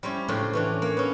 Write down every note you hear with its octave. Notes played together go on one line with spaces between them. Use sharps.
G3 C4 C#4 E4
A2 C#3 C4 D4 F4
E3 C#4 D4
A#3 C#5
B3 C#4